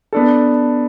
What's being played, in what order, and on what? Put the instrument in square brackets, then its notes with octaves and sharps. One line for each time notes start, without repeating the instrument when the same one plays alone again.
[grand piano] B3 D4 A4